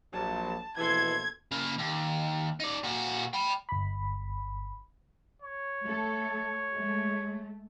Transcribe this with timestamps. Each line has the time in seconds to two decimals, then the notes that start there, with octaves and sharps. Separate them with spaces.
0.13 A#1 F#3 A5
0.77 A#1 B2 E3 A4 C6 G#6
1.52 C#3 A#3
1.79 D#2
2.60 D#4 D5
2.84 A#2 F#4
3.33 G5 B5
3.69 G1 B5
5.42 C#5
5.84 A3 A4
6.73 G#3 A3